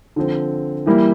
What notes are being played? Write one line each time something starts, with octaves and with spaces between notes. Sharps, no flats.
D3 F3 C4
E3 G3 A#3 E4